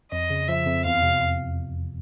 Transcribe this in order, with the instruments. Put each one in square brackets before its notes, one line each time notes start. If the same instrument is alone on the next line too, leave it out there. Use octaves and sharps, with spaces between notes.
[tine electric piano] F2 [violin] D#5
[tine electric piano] C#3
[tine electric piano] F3 [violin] E5
[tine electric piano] F2
[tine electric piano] E2 [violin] F5
[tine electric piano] C3